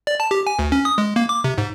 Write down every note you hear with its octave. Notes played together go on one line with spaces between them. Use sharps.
D5
A5
G4
G#5
D2
C#4
D#6
G#3
A#3
D6
C3
G#2